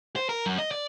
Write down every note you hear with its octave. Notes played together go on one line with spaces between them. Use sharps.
C5
A#4
F#2
D#5
D5